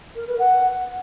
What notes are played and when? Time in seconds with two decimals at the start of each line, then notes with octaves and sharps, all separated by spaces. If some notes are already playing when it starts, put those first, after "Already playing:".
0.15 A#4
0.27 B4
0.39 F#5